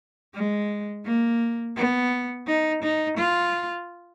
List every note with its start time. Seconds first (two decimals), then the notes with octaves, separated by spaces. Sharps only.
0.34 G#3
1.04 A#3
1.76 B3
2.47 D#4
2.82 D#4
3.17 F4